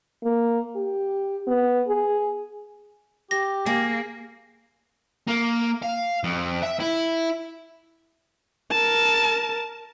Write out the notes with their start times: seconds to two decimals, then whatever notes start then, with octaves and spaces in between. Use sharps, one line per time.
0.23 A#3
0.76 G4
1.47 B3
1.88 G#4
3.31 G4 A#6
3.66 A#3 G#4
5.27 A#3
5.82 F5
6.24 F2
6.63 E5
6.80 E4
8.71 A#4 A5